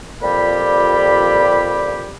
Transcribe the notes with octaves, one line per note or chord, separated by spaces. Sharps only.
F2 A#2 G3 G4 B5